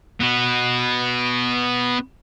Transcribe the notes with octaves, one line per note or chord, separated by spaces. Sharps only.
B3 F#4